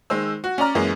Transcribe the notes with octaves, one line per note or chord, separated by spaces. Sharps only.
D#3 G#3 C5 E6
F#4
C#4 D5 A#5 F6
F#2 E3 G#3 A#3 C#4